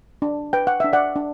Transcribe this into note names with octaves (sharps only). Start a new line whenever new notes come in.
D4
B4 G5
F#5
D4 E5
D5 F#5
D4